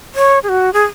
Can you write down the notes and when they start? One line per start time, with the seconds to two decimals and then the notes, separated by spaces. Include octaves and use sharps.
0.15 C#5
0.43 G#4
0.49 F#4
0.73 G#4